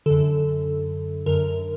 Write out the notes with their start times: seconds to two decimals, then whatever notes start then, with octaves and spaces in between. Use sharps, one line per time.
0.06 F#2 D3 A4
1.26 F#2 D3 A#4